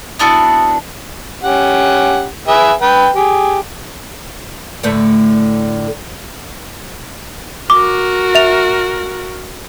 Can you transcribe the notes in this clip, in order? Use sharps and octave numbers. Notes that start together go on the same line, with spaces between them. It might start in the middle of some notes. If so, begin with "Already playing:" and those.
B3 D4 E4 F#4
C#4 G4 F#5
G#4 B4 E5
B4 G5
G4 G#4
A2 D3 A3
F#4 A#4 D6
E5 F7